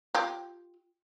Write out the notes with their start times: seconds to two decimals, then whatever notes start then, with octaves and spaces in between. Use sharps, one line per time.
0.15 F4 G4